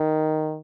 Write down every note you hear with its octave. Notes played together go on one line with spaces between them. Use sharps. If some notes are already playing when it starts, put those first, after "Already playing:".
Already playing: D#3